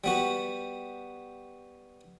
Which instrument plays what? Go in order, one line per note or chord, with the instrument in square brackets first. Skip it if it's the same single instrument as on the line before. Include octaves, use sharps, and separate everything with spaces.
[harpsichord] G3 B3 F#4